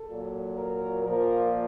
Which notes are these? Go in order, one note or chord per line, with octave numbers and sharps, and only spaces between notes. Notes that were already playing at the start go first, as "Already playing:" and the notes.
Already playing: A4
A#2 F#3
A#4
A#2 F3 A#4